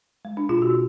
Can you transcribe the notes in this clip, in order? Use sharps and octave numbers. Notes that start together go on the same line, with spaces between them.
G#3
D4
B2 F4
F#4